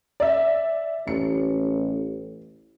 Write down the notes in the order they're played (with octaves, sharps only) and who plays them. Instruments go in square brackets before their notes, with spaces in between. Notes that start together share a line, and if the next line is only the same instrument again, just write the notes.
[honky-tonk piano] D5 E5
[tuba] A1 [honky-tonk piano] C#7